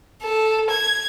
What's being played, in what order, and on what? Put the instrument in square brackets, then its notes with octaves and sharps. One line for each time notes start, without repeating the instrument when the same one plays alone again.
[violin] A4
G#6